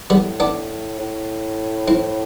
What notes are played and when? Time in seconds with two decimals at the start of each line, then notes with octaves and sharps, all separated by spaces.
0.10 A2 G3 B3
0.40 B3 D4
0.99 A2
1.88 C4 E4